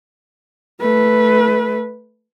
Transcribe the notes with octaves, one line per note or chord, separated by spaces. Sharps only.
A3 B4